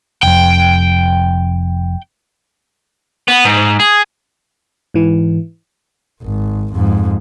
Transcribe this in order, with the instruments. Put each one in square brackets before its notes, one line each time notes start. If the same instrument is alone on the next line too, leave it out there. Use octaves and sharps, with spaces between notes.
[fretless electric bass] F1 F2 [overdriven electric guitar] G5
[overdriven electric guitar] B3
G#2
G#4
[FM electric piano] G#2 E3
[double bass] G#1
F2 G#2